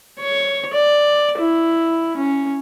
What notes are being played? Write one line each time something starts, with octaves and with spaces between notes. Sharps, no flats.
C#5
D5
E4
C#4